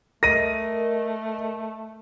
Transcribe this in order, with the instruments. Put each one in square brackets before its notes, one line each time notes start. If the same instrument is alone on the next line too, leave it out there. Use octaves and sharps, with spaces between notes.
[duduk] A3 [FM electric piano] A#4 D#5 [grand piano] A#6 D#7